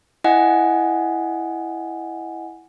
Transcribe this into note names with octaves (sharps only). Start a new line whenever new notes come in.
E4 D#5 F#5 G#5